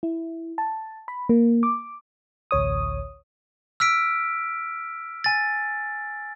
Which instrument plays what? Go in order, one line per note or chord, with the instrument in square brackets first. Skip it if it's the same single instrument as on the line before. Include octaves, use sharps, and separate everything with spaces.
[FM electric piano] E4
A5
B5
A#3
D6
A1 D2 C#5 D#6
[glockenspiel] E6 F6 B6 D7
G#5 A6